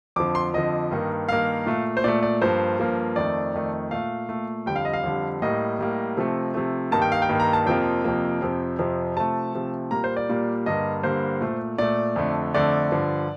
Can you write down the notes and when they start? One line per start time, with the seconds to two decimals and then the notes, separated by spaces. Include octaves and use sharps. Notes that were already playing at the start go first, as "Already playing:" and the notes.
0.16 F2 D3 F3 D6
0.35 C6
0.54 F2 D3 F3 D#5
0.91 G2 D#3 A#3
1.29 G2 D#3 A#3 F5
1.66 A#2 A3
1.97 C5
2.04 A#2 A3 D5
2.23 D5
2.42 G2 F3 A#3 C5
2.79 G2 F3 A#3
3.16 F2 D#3 A3 D5
3.54 F2 D#3 A3
3.91 A#2 A3 F5
4.29 A#2 A3
4.66 F2 D3 G3 G5
4.76 F5
4.85 D#5
4.93 F5
5.03 F2 D3 G3
5.42 A2 G3 A#3 D#5
5.79 A2 G3 A#3
6.17 C3 F3 A3
6.54 C3 F3 A3
6.91 G2 D#3 G3 A#3 A5
7.02 G5
7.12 F5
7.22 G5
7.29 G2 D#3 G3 A#3
7.40 A#5
7.53 A5
7.66 F2 C3 F3 A#3 G5
8.04 F2 C3 F3 A#3
8.42 F2 C3 F3
8.79 F2 C3 F3
9.16 C3 F3 A3 A5
9.54 C3 F3 A3
9.91 A#2 G3 A#3 A#5
10.04 C5
10.17 D5
10.29 A#2 G3 A#3
10.66 G2 D3 G3 A#3 D#5
11.03 G2 D3 G3 A#3 C5
11.41 A#2 A3
11.78 A#2 A3 D5
12.16 F2 D3 A3
12.54 F2 D3 A3 D5
12.92 G2 D3 F3